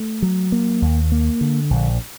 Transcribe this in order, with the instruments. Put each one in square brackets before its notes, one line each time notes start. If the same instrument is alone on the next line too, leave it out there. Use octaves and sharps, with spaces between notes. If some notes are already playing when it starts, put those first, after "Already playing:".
Already playing: [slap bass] A3
F#3
A#3
D#2
A#3
D3
A#1